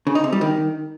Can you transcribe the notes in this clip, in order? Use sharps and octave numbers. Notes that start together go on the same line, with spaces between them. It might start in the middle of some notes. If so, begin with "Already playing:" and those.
C#3
D#4
C3
G3
D#3